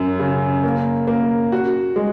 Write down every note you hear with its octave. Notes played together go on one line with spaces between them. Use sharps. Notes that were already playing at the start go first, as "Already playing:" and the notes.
Already playing: F#2
C#3
A#3
A#3
F#4
G#3